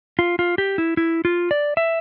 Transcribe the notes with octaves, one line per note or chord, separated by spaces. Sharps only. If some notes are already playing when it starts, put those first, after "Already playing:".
F4
F4
G4
E4
E4
F4
D5
E5